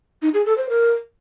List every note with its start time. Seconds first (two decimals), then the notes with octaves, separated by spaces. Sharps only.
0.22 D#4
0.34 G#4
0.46 A4
0.57 C5
0.69 A#4